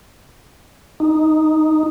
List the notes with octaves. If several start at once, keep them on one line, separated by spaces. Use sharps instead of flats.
D#4